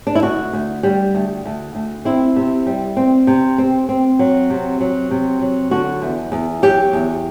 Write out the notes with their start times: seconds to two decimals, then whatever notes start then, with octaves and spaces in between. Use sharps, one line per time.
0.07 D4
0.15 E4
0.23 D2 F#4
0.53 D2
0.83 G3
1.15 D2
1.45 D2
1.75 D2
2.05 C4 E4
2.36 C3
2.66 G3
2.97 C4
3.27 C3
3.58 C4
3.89 C4
4.19 F#3
4.50 C3
4.81 F#3
5.11 C3
5.41 F#3
5.71 D3 F#4
6.02 E2
6.32 E2
6.62 F#3 G4
6.93 E2